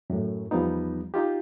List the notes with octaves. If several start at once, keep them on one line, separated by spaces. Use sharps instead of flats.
F#2 A2
E2 F3 G3 B3 D#4
D#4 F4 G4